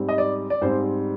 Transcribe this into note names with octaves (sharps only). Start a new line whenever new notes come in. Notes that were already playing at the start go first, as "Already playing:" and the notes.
Already playing: G#2 G3 C4
D#5
D5
D5
G#2 G3 C4 C5